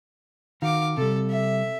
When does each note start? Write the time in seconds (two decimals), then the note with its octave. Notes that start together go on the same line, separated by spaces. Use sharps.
0.62 D#3 F#4 F5 D6
0.97 C3 G3 A4
1.30 E5